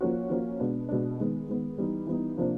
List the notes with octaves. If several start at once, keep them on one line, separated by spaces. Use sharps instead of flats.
F3 A#3 C#4 F#4
F3 A#3 C#4 F#4
B2 G#3 B3 D4
B2 G#3 B3 D4
D#3 G#3 B3
D#3 G#3 B3
E3 G3 B3 D#4
E3 G3 B3 D#4
C3 F3 A#3 D4